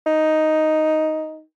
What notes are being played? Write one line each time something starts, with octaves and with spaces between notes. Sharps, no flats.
D#4